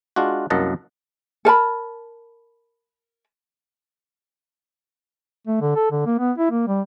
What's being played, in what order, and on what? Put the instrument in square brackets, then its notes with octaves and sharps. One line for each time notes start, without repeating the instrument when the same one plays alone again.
[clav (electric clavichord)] G#3 D4 F4 F#4
C2 F#2 A#3 D#5 F#5 A5
[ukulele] A4 A#4 A5 B5
[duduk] A3
D3
A4
D3
A#3
B3
E4
A#3
G3